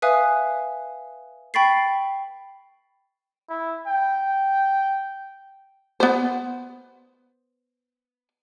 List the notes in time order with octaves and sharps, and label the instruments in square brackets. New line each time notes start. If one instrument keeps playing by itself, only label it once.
[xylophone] B4 E5 F5 G#5 D#6 F#6
G5 B5 C#6 A6 B6 C7
[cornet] E4
G5
[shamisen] B3 C5